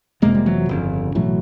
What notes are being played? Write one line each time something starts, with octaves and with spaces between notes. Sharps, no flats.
F1 F2 C3 G#3 A#3
G3
E3 F#3
G1 F2 C#3
B1 A2 E3 F#3